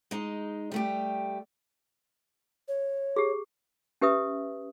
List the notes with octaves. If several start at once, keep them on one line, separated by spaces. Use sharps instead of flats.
G#3 D#4
G3 A3 G4
C#5
G4 G#4
C#4 G4 B4 E5 D#6